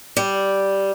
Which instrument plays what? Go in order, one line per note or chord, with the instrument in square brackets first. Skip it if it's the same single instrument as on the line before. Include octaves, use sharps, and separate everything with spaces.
[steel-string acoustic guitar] G3